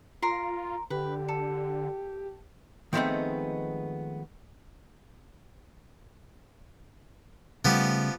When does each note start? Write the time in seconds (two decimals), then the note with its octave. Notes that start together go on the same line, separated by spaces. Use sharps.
0.22 F4 A#4 A#5 C6
0.90 D3 G4 B4
1.28 A4
2.93 D#3 F3 G#3 A3 B3 C4
7.65 C#3 F3 G3 A3 B3 G4